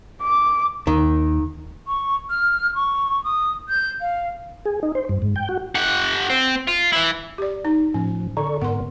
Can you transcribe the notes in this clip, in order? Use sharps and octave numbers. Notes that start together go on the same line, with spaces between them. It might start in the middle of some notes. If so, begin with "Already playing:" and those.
D6
D#2 D#3
C#6
F6
C#6
D#6
G6
F5
G#4
D#4
C5
G2
G#2
G5
F#4
G4 F#5
C4
F4
E3 E4
G4 D5
D#4
A2 F3 C#4
D3 A4 D5 C#6
G#2 B3 A#4 F#5 C6